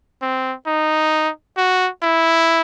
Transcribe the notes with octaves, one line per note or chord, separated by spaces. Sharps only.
C4
D#4
F#4
E4